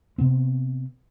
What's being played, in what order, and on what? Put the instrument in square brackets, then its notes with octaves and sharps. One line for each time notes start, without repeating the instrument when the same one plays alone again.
[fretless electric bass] C3 B3 C4